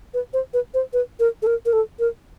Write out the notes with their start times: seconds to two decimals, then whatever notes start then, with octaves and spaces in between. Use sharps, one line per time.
0.14 B4
0.33 C5
0.54 B4
0.74 C5
0.93 B4
1.20 A#4
1.42 A4
1.47 A#4
1.66 A#4
1.73 A4
1.99 A#4